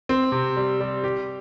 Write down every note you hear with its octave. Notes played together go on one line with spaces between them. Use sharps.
C4
C3
G3
G3
G4